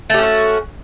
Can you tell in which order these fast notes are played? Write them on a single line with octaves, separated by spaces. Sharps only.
A3 G4 C#4 F#4